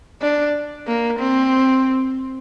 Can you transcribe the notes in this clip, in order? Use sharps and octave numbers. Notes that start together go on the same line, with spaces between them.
D4
A#3
C4